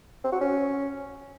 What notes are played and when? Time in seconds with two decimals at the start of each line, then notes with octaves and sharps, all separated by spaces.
0.24 C4
0.32 F#4
0.41 C#4